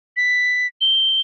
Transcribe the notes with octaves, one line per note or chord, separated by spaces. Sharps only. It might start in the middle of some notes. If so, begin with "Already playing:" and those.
B6
G7